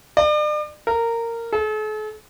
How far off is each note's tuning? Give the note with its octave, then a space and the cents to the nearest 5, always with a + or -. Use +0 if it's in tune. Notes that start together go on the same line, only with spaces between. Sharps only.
D5 +40
A#4 -15
A4 -45